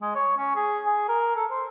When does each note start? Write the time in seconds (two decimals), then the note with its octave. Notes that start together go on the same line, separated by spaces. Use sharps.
0.02 G#3
0.15 C#5
0.37 C#4
0.55 G#4
0.86 G#4
1.08 A#4
1.36 A4
1.51 C5